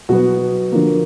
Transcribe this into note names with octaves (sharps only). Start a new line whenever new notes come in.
B2 F#3 B3 F#4
D3 F3 A#3